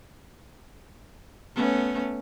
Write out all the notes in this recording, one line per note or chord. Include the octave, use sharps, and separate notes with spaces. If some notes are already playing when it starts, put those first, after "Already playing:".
A3 B3 C#4